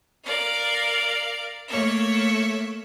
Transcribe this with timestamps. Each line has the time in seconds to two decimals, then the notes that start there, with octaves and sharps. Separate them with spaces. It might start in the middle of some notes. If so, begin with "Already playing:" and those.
0.24 A#4 D5 F5
1.68 A3 A#3 C#5 E5